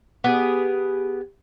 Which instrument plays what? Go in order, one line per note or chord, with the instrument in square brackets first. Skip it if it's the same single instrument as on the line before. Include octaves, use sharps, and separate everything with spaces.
[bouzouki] B3 G4 G#4